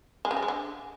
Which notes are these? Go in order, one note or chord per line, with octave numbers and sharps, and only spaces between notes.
G#3
C#3
G3
G#3
D3